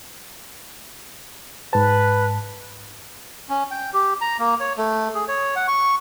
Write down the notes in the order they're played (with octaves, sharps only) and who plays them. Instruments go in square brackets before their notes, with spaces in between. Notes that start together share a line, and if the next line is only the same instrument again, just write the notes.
[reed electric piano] G#2 A5 [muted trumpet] B4
[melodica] C#4
G5
G4
A#5
A#3
C#5
A3
G#4
C#5
F#5
C#6